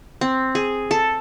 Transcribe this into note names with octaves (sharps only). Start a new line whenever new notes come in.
C4
G#4
A4